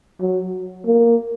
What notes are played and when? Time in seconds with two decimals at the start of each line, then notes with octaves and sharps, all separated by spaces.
0.20 F#3
0.86 A#3